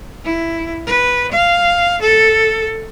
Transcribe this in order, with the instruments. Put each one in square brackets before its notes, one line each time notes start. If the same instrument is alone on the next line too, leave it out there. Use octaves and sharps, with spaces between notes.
[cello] E4
B4
F5
A4